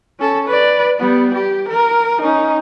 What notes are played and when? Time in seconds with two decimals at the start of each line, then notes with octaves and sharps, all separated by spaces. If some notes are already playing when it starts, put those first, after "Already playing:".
0.20 C#4 A4
0.48 B4 D5
0.99 G3 B3
1.35 G4
1.69 A#4
2.21 C#4 D#4